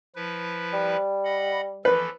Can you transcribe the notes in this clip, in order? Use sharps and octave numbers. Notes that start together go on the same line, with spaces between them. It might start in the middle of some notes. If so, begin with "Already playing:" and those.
F3 E4 B4
G3
D#5 F#5 B5
E3 F3 A4 B4